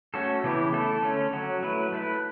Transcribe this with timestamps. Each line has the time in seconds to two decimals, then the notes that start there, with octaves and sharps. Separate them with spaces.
0.14 A3 C#4 F#4 A4
0.44 C#3 E3 B3 E4 G4
0.73 A3 E4 A4
1.02 D3 A3 C#4
1.33 F#3 C#4 F#4
1.63 F#3 A3 E4 B4
1.92 A3 E4 B4